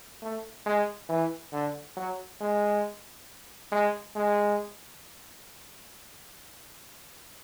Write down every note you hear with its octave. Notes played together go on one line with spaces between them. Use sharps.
A3
G#3
E3
D3
F#3
G#3
G#3
G#3